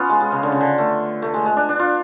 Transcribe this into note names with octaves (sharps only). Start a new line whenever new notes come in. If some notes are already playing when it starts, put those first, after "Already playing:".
Already playing: B3 C#4 F4
G#3
G#3
C#3
D3
C#3
D3
A3
A3
G#3
G#3
D4
D4
F4